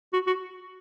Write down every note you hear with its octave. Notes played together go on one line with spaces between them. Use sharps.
F#4
F#4